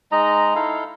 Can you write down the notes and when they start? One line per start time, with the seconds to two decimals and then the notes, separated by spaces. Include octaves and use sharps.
0.12 G#3 D#4 D#5 A#5
0.55 D#4 E4 A4 F5